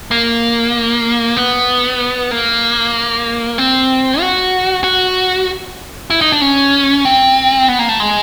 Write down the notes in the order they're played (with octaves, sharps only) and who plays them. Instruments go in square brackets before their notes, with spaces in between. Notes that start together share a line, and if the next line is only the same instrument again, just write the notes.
[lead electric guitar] A#3
B3
A#3
C4
F#4
F#4
E4
D#4
D4
C#4
C4
B3
A#3
A3
G#3